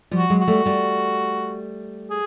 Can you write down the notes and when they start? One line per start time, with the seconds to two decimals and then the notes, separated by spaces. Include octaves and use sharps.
0.11 F3 G3
0.17 F#4
0.30 F#3 G#3
0.41 F#4
0.47 G3 A3
0.65 G3 A3
2.11 G#4